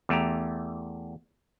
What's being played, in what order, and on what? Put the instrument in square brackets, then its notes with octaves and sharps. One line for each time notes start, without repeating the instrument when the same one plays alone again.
[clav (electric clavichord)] E2 A3 G4 A#5